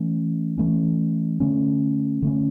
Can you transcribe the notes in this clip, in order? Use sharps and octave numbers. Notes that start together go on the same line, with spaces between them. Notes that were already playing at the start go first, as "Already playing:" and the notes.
Already playing: E3 A3 C#4
E3 A3 C#4
D3 A3 C#4
D3 A3 C#4